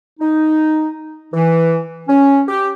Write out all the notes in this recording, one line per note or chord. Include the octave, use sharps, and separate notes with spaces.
D#4
E3
C#4
G4